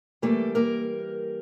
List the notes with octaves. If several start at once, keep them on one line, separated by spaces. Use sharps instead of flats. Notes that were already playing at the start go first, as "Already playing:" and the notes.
E3 G3 A3 A#3 A4
A#3 A#4